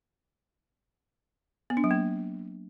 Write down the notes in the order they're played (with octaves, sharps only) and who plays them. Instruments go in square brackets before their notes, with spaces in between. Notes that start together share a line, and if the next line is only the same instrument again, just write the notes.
[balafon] B3
D4
F#3
A#3